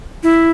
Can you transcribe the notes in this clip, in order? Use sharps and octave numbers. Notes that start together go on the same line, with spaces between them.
E4